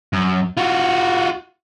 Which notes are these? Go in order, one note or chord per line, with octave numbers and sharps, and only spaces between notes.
F#2
F4 F#4